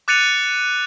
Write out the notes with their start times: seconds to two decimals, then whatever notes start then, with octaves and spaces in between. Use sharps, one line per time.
0.08 D6 F#6 A6 C#7 D#7 F7